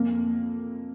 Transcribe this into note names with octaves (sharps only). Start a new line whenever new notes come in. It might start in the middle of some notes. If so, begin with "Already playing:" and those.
Already playing: F2 A#3